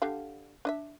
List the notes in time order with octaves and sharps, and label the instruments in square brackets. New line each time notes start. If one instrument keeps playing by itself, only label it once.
[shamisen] D3 G4 F5
D4 D#5 E5